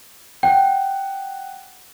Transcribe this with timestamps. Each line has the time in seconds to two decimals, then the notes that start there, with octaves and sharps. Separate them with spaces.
0.43 F#5 G5